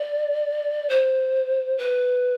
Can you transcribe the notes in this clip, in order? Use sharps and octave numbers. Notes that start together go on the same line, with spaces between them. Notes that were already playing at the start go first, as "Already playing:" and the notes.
Already playing: D5
C5
B4